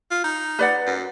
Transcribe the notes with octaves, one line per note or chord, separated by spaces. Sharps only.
F4
D#4
B4 D5 F#5
F#2